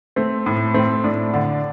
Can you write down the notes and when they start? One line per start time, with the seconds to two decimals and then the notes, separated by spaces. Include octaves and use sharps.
0.16 A3 C4
0.46 A2
0.74 A3 C4
1.04 A2 D4
1.33 D3 D4